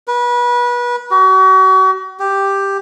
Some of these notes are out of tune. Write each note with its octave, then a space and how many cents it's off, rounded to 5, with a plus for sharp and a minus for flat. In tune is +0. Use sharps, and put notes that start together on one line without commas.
B4 -30
F#4 +35
G4 +5